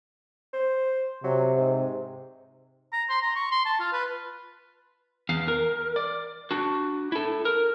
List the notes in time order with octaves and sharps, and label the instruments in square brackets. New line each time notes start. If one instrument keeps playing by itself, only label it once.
[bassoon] C5
[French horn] C3 [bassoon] F#3
[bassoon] G#2
[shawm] A#5
C6
A#5
C#6
C6
A5
F4
B4
[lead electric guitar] E2 F5
A#4
D5
D4 F#4
E4 A4
A#4